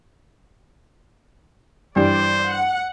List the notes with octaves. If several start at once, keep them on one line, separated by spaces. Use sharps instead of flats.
G2 E3 G3 C5 D5
F#5